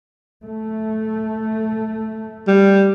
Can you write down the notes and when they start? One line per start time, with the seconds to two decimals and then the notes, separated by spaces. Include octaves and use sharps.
0.43 A3
2.47 G3